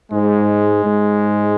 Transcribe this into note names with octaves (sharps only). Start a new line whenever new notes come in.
G#2 G#3
G#2